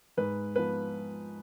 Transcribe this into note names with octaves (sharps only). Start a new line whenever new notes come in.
G#2 B4
F3 B3 B4